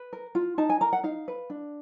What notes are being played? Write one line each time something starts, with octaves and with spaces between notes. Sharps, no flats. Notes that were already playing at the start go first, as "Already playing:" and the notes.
Already playing: B4
A#4
F4
D#4 A5
G#5
A#4 A#5
F#5
D#4 F5
B4
D4